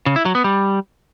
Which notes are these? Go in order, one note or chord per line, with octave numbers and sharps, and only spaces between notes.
C#3
E4
F#3
B3
G3